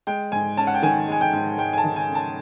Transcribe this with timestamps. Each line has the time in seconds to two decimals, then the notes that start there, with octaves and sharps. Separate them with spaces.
0.07 G#3 G5
0.32 G#2 G#5
0.57 C#4 A5
0.67 F#5
0.74 G5
0.83 D#3 G#5
1.08 G#3 G#5
1.21 G5
1.33 G#2
1.58 G#3 G5
1.73 G#5
1.78 A5
1.84 D#3
1.96 G#5
2.09 C#4
2.15 A5